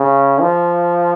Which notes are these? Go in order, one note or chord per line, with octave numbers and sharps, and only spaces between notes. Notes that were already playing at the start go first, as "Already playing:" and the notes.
Already playing: C#3
F3